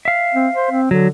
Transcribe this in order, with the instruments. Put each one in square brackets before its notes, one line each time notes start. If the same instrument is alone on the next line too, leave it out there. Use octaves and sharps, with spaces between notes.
[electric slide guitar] E5 F5
[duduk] C4
C5
C4
[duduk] D3 [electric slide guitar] F#3